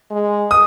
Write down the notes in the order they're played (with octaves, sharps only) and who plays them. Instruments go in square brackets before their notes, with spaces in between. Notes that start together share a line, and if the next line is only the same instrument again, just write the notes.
[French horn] G#3
[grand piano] D#6